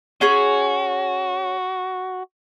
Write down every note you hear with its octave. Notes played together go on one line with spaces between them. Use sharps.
C#4 F#4 G#4 C#5